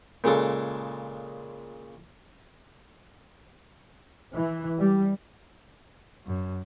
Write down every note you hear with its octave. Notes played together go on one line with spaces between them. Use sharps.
A#2 C#3 G#3 A4
E3
G3
F#2